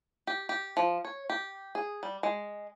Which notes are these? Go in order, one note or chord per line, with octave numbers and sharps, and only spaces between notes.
G4
G4
F3
C#5
G4
G#4
G3
G#3